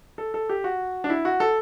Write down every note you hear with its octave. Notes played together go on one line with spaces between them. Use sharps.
A4
A4
G4
F#4
D4
E4
F#4
A4